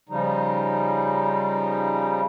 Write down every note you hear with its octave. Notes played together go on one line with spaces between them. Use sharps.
C#3 F3 G3 D#4